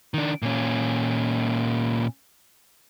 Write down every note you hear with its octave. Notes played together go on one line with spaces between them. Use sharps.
D#3 D4
A#2 C#4